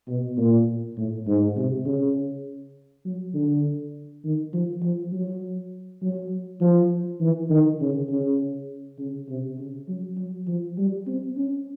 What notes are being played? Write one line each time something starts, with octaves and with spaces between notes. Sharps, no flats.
B2
A#2
A2
G#2
C3
C#3
F#3
D3
D#3
F3
F3
F#3
F#3
F3
E3
D#3
C#3
C#3
C#3
C3
C#3
F#3
F#3
F3
G3
C4
C#4